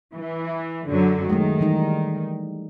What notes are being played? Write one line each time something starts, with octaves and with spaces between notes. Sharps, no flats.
E3
F#2 D3 F#3
D#3 G#3 A3
E3 G3 D#4